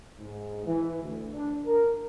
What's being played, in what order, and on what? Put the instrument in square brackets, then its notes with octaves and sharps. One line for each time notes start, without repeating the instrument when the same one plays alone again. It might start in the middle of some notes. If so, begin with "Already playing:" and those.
[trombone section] G#2
E3
D2
D4
A#4